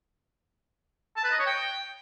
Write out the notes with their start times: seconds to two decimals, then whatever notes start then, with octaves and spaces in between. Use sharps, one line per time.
1.16 A5
1.24 B4
1.31 D#5
1.39 C#5
1.46 G5